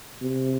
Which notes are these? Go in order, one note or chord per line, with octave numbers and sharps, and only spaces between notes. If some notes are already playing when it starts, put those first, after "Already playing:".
C3